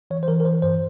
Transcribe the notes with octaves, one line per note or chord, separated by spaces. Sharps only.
E3 C#5
C5
E3 A#4
A#4
E3 C5
G2 C5